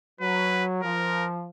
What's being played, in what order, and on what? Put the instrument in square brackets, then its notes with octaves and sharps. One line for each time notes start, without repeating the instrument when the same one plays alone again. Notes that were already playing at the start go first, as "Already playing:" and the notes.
[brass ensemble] F#3 [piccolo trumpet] B4
[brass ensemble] F3 [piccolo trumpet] A#4